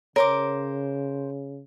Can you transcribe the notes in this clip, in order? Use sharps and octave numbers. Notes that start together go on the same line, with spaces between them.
C#3 A#4 C5 C#5 D6